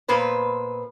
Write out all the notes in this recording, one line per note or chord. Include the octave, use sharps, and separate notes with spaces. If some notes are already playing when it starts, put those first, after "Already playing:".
A#2 B3 B4 C5